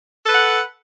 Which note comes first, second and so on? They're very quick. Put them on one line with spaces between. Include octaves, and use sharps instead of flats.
A4 B4 F#5